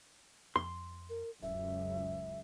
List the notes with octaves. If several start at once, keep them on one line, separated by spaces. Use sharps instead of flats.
F2 C6
A#4
D1 C#2 F#2 E5